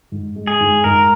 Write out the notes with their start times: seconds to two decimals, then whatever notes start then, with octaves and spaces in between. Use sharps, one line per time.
0.12 G#2
0.36 G#3
0.47 G#4
0.60 G#2
0.84 G#2 A#4